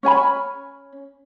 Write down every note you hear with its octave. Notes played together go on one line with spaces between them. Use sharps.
C#4 C#5 G#5 B5